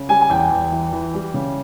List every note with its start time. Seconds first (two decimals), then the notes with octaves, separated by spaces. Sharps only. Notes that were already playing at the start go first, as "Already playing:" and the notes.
Already playing: C#3
0.09 G3 G#5
0.21 G#5
0.30 E2 G5
0.51 E2
0.72 E3
0.92 E3
1.14 G3
1.34 C#3